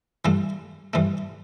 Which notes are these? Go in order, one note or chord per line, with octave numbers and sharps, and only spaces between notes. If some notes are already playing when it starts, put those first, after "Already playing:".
G2 E3 A3
G2 E3 A3